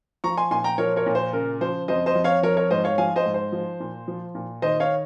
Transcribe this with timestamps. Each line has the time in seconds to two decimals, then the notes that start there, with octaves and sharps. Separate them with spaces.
0.24 F3 A#5 C#6
0.37 G#5 C6
0.51 A#2 G#5 C6
0.64 G5 A#5
0.78 F3 A#4 C#5
0.96 A#4 C#5
1.06 A#2
1.15 C5
1.33 C#3 A#4
1.61 F3 C5
1.88 F2 C5 D#5
2.06 C5 D#5
2.15 F2
2.24 C#5 F5
2.43 F3 A#4 C#5
2.57 A#4 C#5
2.70 G#2 C5 D#5
2.84 C#5 F5
2.98 F3 F5 G#5
3.16 C5 D#5
3.26 G#2
3.34 C5
3.52 F3
3.80 A#2
4.08 F3
4.35 A#2
4.62 D#3 C5 D#5
4.80 C#5 F5